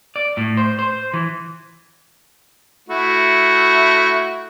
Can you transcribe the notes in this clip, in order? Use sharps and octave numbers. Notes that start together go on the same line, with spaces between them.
D5
A2
C5
C5
E3
A3 E4 F#4